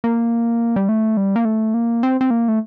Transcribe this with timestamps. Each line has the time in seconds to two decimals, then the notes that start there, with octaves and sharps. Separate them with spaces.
0.04 A#3
0.76 G3
0.89 A3
1.17 G3
1.36 A#3
1.45 A3
1.74 A#3
2.03 C4
2.21 C4
2.31 A#3
2.48 A3